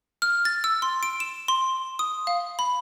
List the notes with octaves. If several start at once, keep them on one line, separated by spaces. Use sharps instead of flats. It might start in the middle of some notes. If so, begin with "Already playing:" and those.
F6
A6
E6
C6
D7
E7
C6
D#6
F5
B5